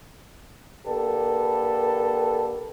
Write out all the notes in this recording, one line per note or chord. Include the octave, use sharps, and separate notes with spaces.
D3 A#3 G4 A4 B4